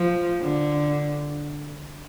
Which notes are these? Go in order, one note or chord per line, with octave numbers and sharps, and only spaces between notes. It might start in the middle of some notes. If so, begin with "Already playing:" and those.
Already playing: F3
D3